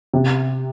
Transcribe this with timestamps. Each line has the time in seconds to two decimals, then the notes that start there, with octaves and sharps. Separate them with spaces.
0.13 C3